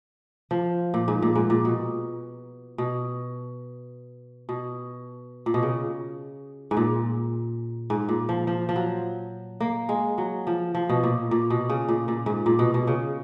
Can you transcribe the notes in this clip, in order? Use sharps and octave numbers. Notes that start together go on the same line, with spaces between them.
F3
A#2
G#2
A#2
G#2
A#2
B2
B2
B2
A#2
B2
C#3
G#2
A#2
G#2
A#2
F3
F3
F3
F#3
A#3
G#3
F#3
F3
F3
B2
A#2
A#2
B2
C#3
A#2
A#2
G#2
A#2
B2
B2
C#3